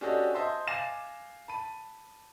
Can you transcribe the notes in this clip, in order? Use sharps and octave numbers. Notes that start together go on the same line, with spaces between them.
C#4 D4 F#4 G4 A4 D#5
C5 D#5 E5 A5 C6
F5 G#5 D6 A6 A#6 E7
A5 B5 D#7